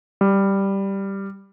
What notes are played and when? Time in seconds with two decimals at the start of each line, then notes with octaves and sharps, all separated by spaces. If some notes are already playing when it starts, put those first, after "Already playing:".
0.21 G3